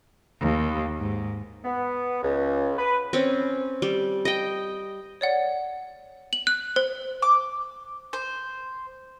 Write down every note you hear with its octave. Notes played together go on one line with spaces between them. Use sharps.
D#2
G#2
B3
C#2
B4
C4 C#4
G3
D#5 G5
C#5 D5 F#5
F#7
F#6
C5
D6
C5